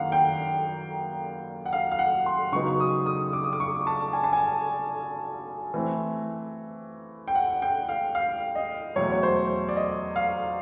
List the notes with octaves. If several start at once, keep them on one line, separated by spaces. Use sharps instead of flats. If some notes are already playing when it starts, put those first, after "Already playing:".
Already playing: F#2 D#3 F#3 A#3 F5 F#5
G5
F#5
F5
F5
F#5
C6
C#3 F#3 B3 D#4 C#6
D#6
D#6
D6
D#6
D6
C#6
A5
G#5
A5
G#5
E3 A3 C4
G5
F#5
G5
F5
F5
D#5
E2 B2 F#3 A3 C#5
C#5
C5
D5
D#5
F5